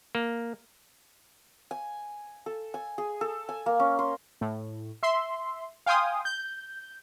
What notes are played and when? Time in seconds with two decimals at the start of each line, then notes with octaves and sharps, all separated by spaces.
0.15 A#3
1.71 G#5
2.46 A4
2.74 G#5
2.98 G#4
3.21 A4
3.49 G#5
3.66 A#3
3.80 C#4
3.99 C6
4.41 A2
5.03 E5 C6
5.86 F5 G5 G#5 C6 D#6
6.25 G6